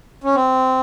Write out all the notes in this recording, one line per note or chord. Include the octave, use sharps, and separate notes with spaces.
C#4
C4